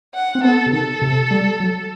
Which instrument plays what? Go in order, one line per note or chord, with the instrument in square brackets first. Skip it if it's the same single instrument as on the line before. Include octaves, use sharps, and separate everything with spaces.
[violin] F#5
[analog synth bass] C4
[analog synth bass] B3 [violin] A4
[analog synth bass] C3
[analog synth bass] D#3 [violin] A4
[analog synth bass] C3
G3
F#3